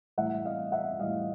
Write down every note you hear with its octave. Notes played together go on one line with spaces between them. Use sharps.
A2 E3 G3 E5 F#5
D#5 F5
E5 F#5
A2 E3 G3 D#5 F5